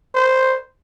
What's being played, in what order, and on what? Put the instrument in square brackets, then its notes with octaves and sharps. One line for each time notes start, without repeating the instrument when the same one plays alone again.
[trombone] C5